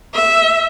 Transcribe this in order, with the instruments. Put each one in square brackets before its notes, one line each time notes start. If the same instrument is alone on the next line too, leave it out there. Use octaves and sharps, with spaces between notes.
[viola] E5